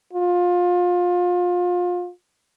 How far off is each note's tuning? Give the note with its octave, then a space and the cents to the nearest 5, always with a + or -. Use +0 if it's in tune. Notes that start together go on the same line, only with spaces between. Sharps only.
F4 +25